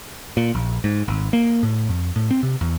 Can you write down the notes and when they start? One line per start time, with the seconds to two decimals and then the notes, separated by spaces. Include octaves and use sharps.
0.37 A#2
0.55 A#1
0.84 G#2
1.08 G#1
1.33 A#3
1.63 A2
1.89 F2
2.16 A2
2.31 C4
2.43 C3
2.61 E2